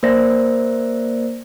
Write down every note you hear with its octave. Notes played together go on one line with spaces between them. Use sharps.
A#3 A#4 C5 D5 A#6